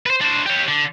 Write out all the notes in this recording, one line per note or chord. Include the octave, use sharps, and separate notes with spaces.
B4 C5
D4 C5
G4 C#5
D3